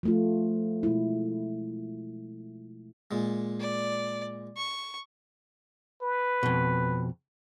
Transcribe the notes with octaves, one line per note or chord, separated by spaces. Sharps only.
F3 A3 F4
B2 G#3 E4
A#2 G#3
D5
C#6
B4
F2 B2